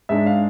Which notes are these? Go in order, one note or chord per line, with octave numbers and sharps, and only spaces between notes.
G#2 G#3 D4 E5
F5